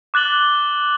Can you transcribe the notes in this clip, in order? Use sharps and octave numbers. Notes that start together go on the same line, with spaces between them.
D6 F#6 A6 F#7 G7